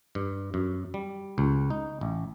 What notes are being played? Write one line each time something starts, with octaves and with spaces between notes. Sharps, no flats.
G2
F#2
G3
C#2
D#4
A1